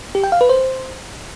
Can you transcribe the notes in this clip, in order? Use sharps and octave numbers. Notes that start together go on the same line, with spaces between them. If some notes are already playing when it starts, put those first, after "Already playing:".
G4
G5
F5
B4
C5